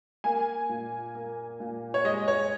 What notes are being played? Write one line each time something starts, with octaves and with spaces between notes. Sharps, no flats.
A#3 G#5
A#2
A#3
A#2
C#5
G#3 D#5
C#5